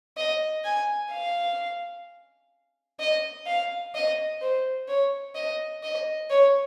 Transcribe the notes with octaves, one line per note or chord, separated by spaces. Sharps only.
D#5
G#5
F5
D#5
F5
D#5
C5
C#5
D#5
D#5
C#5